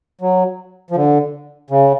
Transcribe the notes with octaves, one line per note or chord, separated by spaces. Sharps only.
F#3
F3
D3
C#3